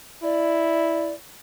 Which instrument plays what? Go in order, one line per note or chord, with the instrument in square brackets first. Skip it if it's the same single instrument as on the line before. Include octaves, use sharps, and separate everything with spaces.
[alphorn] E4 [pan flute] D5